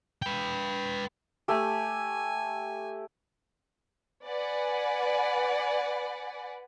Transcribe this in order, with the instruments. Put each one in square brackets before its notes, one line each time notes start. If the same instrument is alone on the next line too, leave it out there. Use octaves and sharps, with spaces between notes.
[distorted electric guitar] B4 G5
[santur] A3 G4 [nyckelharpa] G#5
[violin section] B4 D5 F#5 G#5